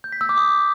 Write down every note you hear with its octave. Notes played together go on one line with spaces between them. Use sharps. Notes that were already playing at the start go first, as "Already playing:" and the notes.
G6
B6
E6
D6
D#6